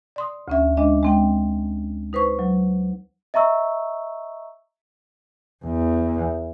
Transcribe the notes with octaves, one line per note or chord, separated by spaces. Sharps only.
D5 C6 D#6
D2 C#4 E5
G#3 D4 D#5
G#3 C4 G5
D#4 B4 C5 C#6
F#3
D#5 E5 A#5 C#6 E6
E2